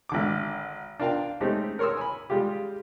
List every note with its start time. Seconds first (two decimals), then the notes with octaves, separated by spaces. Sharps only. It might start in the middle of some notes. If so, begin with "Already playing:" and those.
0.09 G#1 D3 D6
1.00 D4 F4 A#4 F5 G5 A5
1.41 G#3 A3 C4 C#4 D#4 G4
1.79 A#4 C#5 C6 D#6 E6
1.97 G#5 B5
2.30 G3 G#3 F4 G4